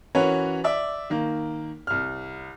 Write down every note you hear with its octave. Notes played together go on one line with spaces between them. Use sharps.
E3 C#4 F#4 A#4 B4 C#5
D5 E5 D6
D#3 A#3
C2 F6